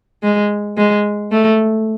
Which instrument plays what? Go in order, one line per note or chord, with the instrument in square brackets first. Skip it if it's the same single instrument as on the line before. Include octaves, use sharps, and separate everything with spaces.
[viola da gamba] G#3
G#3
A3